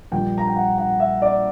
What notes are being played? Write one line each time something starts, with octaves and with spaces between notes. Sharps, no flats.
A#1 A#2 G3 G5
A#5
G5
F#5
F#5
E5
D5